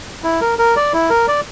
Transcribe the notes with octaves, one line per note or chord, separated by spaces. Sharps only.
E4
A#4
A#4
D5
E4
A#4
D5